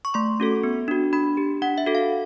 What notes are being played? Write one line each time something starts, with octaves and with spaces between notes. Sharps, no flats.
C#6
A3 C6
C#4 F#4 A4
B3
D4 F#4
D4 B5
G4
D4 F#5
E5
F#4 A4
F5